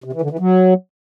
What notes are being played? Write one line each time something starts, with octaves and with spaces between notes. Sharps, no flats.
C3
E3
D3
E3
F#3